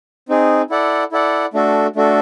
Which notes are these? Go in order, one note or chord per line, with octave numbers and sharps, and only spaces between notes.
C4 D#4 G#4
E4 A4 D5 F#5
E4 A4 D5 F#5
A3 D4 F#4 A4
A3 D4 F#4 A4